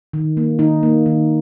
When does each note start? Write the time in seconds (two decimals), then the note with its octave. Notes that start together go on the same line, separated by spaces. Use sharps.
0.13 D#3
0.37 A#3
0.59 D#3 D#4
0.83 A#3
1.06 D#3